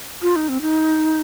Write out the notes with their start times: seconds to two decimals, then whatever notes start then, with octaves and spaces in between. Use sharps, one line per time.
0.22 F4
0.36 D#4
0.49 C4
0.62 D#4